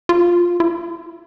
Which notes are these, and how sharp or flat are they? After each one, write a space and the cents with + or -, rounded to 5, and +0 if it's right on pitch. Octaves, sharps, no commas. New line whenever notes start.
F4 +5
F4 -35